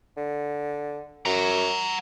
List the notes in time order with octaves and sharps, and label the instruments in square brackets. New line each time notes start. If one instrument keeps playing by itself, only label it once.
[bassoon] D3
[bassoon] F#2 [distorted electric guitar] F#5 A#5